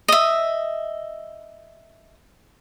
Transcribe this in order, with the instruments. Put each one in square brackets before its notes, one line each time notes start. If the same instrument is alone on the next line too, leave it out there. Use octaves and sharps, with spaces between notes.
[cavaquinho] D#5 E5